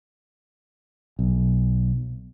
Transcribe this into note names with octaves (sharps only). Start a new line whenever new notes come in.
B1